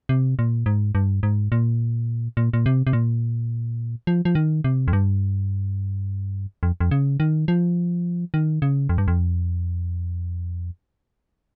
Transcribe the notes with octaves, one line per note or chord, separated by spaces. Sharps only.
C3
A#2
G#2
G2
G#2
A#2
A#2
A#2
C3
C3
A#2
F3
F3
D#3
C3
F2
G2
F2
F2
C#3
D#3
F3
D#3
C#3
F2
G2
F2